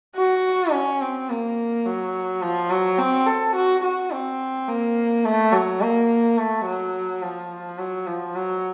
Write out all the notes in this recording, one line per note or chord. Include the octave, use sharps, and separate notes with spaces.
F#4
C#4
C4
A#3
F#3
F3
F#3
C4
A4
F#4
F#4
C4
A#3
A3
F#3
A#3
A3
F#3
F3
F#3
F3
F#3